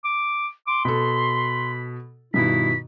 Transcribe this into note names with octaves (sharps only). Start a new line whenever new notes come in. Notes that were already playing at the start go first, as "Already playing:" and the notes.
D6
C6 D6
B2 A4 B5
G2 B2 D#3 E4 B6